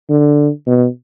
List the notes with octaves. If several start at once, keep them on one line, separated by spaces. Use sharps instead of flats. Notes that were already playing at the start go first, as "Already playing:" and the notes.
D3
B2